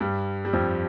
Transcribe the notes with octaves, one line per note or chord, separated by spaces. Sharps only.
G2 G3
G3
F2 F3